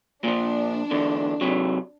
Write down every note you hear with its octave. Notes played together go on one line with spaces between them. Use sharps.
A#2 F3 D4
E2 D3
C3 F#3